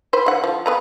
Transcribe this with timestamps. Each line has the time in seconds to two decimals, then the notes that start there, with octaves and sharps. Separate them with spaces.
0.13 B4 C5
0.26 D3 F#5
0.44 F3
0.66 B3 B4 A#5